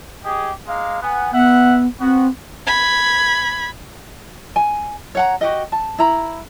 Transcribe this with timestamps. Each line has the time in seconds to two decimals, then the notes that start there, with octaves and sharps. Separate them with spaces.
0.25 G4 G#4 D#5
0.67 G#3 A#3 F5
1.02 B3 F#5 G#5
1.32 B3 E5 F#5
2.00 B3 C4 F#4
2.67 B5 G#6
4.56 G#5
5.15 C#5 F#5 A#5
5.41 F#4 G4 D#5
5.72 A5
5.99 E4 A#5 B5